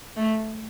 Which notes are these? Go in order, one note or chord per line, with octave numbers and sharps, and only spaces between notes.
A3